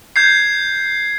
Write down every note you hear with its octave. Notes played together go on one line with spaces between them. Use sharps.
G6 G#6 C7